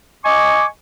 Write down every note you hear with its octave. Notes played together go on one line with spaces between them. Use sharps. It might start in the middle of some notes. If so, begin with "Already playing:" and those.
D#5 G#5 C#6 D6